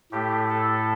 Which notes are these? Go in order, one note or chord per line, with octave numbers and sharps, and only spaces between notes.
A2 A3 G4
A4